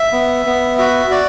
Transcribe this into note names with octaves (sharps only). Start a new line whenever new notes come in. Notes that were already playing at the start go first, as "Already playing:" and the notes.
Already playing: E5
B3
B3
F#4 E5
F#4 D5